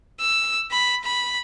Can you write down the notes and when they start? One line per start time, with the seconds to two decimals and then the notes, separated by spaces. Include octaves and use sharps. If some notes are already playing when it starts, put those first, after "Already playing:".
0.20 E6
0.71 B5
1.04 B5